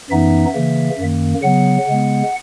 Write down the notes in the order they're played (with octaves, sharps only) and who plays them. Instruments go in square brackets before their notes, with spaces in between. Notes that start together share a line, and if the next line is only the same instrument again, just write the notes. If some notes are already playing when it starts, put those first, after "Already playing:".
[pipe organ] F#2 E3 B3 D#4 E5
C#3 E3 A#3
F#2 D#3 A#3
C#3 F#3 B3 F#5
C#3 G#3 B3